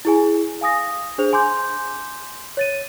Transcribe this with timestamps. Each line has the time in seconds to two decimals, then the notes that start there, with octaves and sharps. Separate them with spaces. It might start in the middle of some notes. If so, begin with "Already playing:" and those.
0.05 E4 G#4 G#5
0.61 F5 G#5 D#6 A#6
1.18 D4 G#4 C5 F7
1.33 G#5 C6 D6 G6
2.57 C#5 A6 D#7